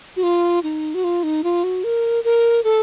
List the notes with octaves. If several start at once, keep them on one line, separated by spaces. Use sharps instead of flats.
F#4
F4
D#4
F#4
F4
D#4
F4
F#4
A#4
A#4
A4